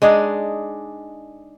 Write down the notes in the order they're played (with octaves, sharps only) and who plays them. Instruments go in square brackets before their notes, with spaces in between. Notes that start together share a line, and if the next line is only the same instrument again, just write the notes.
[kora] G#3 D4 D#4 G#4